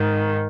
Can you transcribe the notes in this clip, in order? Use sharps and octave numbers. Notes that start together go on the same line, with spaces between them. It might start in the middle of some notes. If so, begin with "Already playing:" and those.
Already playing: G#2 D#3